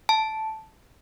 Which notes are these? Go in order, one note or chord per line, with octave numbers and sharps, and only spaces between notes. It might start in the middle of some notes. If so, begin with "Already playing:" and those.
A5